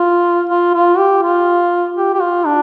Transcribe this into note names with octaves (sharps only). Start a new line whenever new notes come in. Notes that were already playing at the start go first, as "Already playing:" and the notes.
Already playing: F4
F4
F4
G4
F4
G4
G4
F4
D4